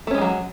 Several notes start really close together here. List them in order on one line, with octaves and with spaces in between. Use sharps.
A3 C#4 G#3 E3 F#3